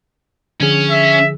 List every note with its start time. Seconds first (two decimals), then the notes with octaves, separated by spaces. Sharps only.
0.60 D3 F3 C#4 G#4
0.91 E5